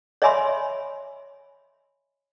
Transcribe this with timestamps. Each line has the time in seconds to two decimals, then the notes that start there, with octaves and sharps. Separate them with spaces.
0.22 C#5 D#5 E5 G#5 B5 C6